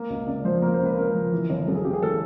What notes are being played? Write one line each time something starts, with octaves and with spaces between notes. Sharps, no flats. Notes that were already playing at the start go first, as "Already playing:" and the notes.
Already playing: A#3
C#2
C#3 D5
F3 C5
A#3 A#4
C5
C#2
B4
C#3 A#4
F3
E3
G1
F#2 A4
G#4
C#3 G4
G#4
E3 A4